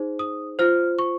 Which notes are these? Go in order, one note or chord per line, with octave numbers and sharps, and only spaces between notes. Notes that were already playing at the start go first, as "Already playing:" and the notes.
Already playing: D#4 G#4 C5
D#6
F4 C5 F6
C#6